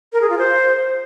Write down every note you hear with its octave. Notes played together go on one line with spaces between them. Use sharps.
A#4
G#4
F4
C5